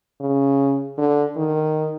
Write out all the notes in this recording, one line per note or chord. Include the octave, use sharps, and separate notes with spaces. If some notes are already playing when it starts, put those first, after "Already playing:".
C#3
D3
D#3